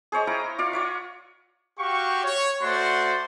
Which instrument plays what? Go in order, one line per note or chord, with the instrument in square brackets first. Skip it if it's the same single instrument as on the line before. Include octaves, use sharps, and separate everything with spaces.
[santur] G#4 C5 C#5 D#5
E4 F5 G5 A#5
F4 D5 F5
F4 C#5 E5 F#5
[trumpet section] F#4 G4 F5 C#6
C#5
A3 F#4 C5 D5 F#5 C6